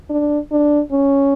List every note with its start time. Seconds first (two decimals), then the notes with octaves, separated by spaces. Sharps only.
0.10 D4
0.52 D4
0.92 C#4